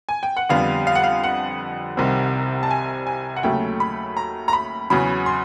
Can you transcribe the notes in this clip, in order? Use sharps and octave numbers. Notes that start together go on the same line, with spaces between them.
G#5
G5
F#5
F2 D3 G3 B3 F5
F5
F#5
F5
F#5
C2 C3 D#3 G3 C4
A5
G#5
G#5
F#5
D#2 C#3 F#3 A3 G5
B5
A#5
A#5
B5
E2 C#3 F#3 B5
C6